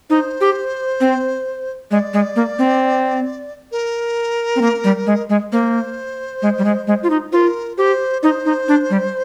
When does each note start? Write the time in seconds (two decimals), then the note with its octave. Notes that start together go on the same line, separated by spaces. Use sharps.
0.10 D#4 C5
0.41 G4
1.00 C4
1.91 G#3 D5
2.13 G#3
2.36 A#3
2.59 C4
3.72 A#4
4.56 C4
4.61 A#3
4.84 G3
5.06 G#3
5.29 G#3
5.52 A#3 C5
6.42 G#3
6.58 G3
6.65 G#3
6.87 G#3
7.03 F4
7.10 D#4
7.32 F4 A#4 C5
7.77 G4 C5
8.22 D#4 D5
8.26 C5
8.45 D#4
8.68 D4
8.90 G3